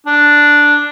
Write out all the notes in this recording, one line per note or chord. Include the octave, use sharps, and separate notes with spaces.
D4